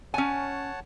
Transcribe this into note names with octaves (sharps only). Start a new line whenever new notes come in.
C#4 C#5 F#5 G#5 A5